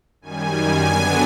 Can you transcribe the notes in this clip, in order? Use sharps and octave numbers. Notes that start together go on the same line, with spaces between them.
F#2 D#3 G3 G#5
D3 F#3 B3 D4 G#5